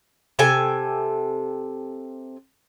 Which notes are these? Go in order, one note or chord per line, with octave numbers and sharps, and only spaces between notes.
C3 A4 G5 G#5